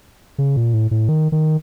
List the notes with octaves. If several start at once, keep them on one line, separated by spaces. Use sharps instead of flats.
C#3
A#2
A2
A2
D#3
D#3